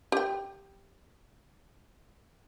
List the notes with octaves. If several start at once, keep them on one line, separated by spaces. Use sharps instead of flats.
G4 G5